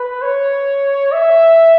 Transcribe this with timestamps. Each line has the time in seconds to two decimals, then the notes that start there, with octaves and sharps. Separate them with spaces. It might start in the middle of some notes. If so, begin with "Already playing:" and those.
Already playing: B4
0.22 C#5
1.12 E5